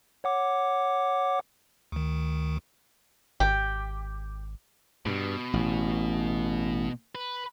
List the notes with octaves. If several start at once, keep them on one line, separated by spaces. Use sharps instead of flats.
C#5 F#5 D6
D2 D#3
G#1 G4
G2 B2
A1
B4